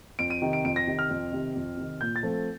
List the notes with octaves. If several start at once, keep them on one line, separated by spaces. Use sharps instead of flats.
F2 D7
D#7
C3 D#3
D7
F2 D7
A#6
C3 D#3
F6
F2
C3 D#3
F2
C3 D#3
A#2 G6
A6
F3 A3 C4